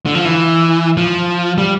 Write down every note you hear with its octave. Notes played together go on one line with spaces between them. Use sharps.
D3
F3
E3
F3
G3